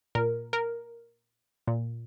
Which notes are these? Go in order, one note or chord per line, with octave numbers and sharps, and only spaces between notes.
A#2 A#4
A#4
A#2